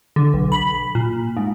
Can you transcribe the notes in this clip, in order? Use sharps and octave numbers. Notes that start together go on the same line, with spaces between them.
D3
B1
B5
A#2
G#2